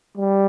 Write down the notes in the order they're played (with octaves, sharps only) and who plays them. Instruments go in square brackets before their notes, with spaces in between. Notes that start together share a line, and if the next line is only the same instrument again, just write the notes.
[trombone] G3